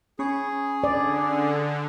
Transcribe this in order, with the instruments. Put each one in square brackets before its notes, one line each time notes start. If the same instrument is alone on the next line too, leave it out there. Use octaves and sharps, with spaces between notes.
[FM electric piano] C#4 B5 C#6 [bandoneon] G#4
[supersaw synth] D3 [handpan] D5